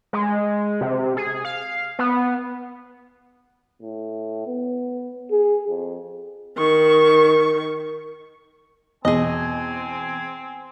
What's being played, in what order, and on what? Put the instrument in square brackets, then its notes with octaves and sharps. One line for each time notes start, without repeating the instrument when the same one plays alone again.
[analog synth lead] G#3
C3
G#4
F5
B3
[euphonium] A2
B3
G#4
F2
[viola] D#3 C#6
[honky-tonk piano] E2 B2 [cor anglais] C4 [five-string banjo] G#4 D#5 [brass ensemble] G#5